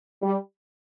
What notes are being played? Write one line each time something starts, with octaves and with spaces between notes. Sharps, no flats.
G3